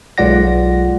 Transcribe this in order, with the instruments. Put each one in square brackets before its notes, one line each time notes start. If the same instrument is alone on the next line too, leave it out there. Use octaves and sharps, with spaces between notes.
[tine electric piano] B1 G#3 F4 D5 F#5 A#6